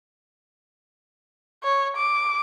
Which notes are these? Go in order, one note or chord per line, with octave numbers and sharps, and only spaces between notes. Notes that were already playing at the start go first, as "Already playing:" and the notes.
C#5
D6